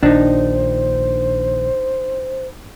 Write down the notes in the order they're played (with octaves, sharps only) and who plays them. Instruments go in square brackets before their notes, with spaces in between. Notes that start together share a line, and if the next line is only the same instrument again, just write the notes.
[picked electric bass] A#1 D#3 [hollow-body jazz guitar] D4 D#4 [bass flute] C5